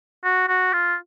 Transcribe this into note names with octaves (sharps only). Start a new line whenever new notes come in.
F#4
F#4
F4